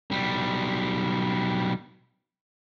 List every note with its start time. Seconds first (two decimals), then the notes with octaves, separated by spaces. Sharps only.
0.11 B1 G3